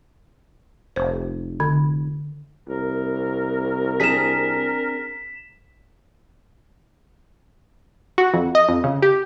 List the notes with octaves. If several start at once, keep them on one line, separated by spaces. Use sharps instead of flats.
F1 C5
D3
C2 A#4
C4 D4 G#4 B6 E7
F#4
F2
D#5
F2
C#3
G4